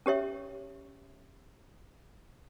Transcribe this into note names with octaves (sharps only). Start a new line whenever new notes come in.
C#4 G4 C#5 E5